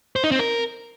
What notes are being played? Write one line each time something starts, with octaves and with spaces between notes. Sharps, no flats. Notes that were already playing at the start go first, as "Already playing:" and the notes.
C5
D#4
C4
A#4